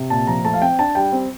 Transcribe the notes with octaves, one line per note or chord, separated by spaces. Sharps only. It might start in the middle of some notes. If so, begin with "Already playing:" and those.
Already playing: C3
A#2 A5
F3 A#5
A3 A5
F5
C4 G5
D4 A5
G3 G5
C4